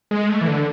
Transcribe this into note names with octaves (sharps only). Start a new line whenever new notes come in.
G#3
A3
E3
D3